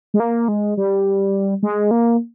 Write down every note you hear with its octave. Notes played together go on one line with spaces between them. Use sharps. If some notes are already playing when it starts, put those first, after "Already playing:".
G#3
A#3
G#3
G3
G#3
A#3